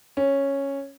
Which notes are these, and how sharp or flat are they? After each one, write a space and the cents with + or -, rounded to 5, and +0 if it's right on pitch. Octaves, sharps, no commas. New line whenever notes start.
C#4 -5